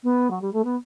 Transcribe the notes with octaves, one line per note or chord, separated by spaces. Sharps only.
B3
F#3
G3
A3
B3